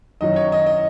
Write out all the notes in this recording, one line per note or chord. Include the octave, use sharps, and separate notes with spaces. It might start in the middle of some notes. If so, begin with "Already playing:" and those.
F#2 D#3 F#3 D#5
C#5
D#5
D#5